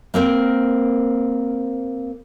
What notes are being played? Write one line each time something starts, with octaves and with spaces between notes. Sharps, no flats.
A#3 C4 A#4 C5